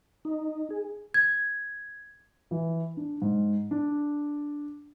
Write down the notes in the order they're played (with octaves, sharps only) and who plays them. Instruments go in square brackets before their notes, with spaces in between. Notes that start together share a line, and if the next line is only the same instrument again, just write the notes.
[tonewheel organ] D#4
G#4
[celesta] G#6
[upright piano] E3
D4
G#2
D4